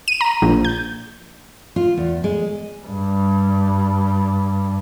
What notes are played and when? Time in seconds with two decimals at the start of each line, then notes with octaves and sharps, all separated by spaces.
0.08 D#7
0.21 A#5
0.42 A#1
0.65 G6
1.76 F4
1.97 E2
2.24 G#3
2.86 G2 G3